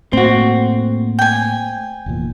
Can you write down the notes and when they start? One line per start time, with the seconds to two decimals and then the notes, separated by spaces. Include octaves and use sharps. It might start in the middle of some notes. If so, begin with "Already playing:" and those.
0.13 A2 A3 A#3 C4 F#4
1.19 G5 G#5
2.06 F1 E2 A#2